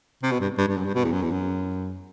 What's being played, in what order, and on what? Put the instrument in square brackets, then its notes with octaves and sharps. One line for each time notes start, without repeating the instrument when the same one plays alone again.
[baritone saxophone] C3
B2
G2
G2
G2
F#2
G2
B2
E2
F#2
E2
F#2